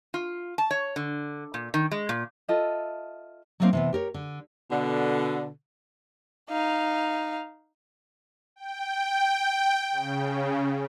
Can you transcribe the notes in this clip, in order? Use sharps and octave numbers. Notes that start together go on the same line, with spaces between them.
F4
A5
C#5
D3
A#2
D#3
G#3
A#2
F4 A4 D#5 E5
F#3 G3 A3 A#3 C4 D#4
C3 E3 B3
G4 A#4 C#5
D3
B2 D3
D#4 F5
G5
C#3